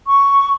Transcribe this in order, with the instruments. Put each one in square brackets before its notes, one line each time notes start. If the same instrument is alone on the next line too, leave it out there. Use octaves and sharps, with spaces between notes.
[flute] C#6